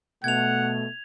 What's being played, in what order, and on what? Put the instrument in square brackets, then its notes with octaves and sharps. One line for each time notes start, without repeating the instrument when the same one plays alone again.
[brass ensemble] B2 A3 [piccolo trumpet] F#5 [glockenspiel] G#6 F7